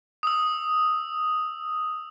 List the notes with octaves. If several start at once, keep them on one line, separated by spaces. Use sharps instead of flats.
D#6 E6